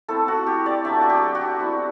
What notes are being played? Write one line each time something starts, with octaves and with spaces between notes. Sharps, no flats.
A3 C4 E4 A4
F#4
G4
D5
F#3 A3 D4 E5
F#4
G4
F#4
G3 C4 E4